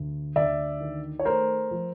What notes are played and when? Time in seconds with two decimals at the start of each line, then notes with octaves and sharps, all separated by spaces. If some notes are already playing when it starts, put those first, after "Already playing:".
Already playing: D2
0.36 D2 D5 E5
0.81 D#3
1.19 C#5
1.25 A3 A#4 C5
1.71 F3